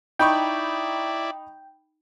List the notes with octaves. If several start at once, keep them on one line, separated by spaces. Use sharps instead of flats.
D#4 E4 D5 G5 B5 C#6